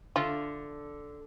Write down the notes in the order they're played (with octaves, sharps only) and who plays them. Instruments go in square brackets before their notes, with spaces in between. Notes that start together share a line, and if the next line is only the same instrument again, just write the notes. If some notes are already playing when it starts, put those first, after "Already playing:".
[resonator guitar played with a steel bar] D3 [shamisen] A3 F4